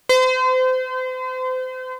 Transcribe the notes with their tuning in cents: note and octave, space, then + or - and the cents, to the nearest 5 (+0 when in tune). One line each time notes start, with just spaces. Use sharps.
C5 -35